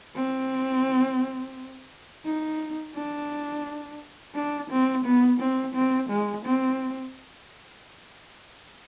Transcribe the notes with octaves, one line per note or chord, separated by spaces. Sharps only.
C4
D#4
D4
D4
C4
B3
C4
C4
G#3
C4